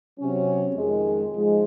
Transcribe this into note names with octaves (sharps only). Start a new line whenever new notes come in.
C3 F#3 C#4
F2 D#3 G#3
G#2 F3 G#3